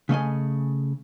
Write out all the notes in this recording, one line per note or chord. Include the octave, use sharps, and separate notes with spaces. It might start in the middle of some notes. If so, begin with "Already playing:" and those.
C#3 A3 D#5 G#5